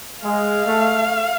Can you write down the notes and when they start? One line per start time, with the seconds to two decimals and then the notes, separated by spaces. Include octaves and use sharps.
0.24 G#3 F5
0.66 A3